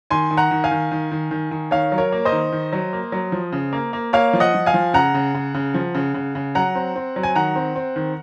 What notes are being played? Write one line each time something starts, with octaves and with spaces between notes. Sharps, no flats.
D#3 G#5 C6
D#3
F#5 A#5
D#3
F5 G#5
D#3
D#3
D#3
D#3
D#3
D#3 C#5 F5
F#3
A#4 C#5
A#3
C5 D#5
D#3
D#3
F#3
A#3
F#3
F3
C#3
A#3
A#3
A#3 C#5 F5
F3
D#5 F#5
F3
F5 G#5
F3
C#3 F#5 A#5
C#3
C#3
C#3
F3
C#3
C#3
C#3
F#3 F#5 A#5
C4
C4
F#3
G#5
D#3 F#5 A#5
C4
C4
D#3